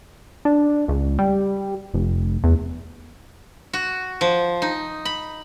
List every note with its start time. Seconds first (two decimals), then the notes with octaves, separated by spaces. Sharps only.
0.45 D4
0.88 C#2
1.19 G3
1.94 F1
2.44 E2
3.73 F#4
4.21 F3
4.62 D#4
5.05 B5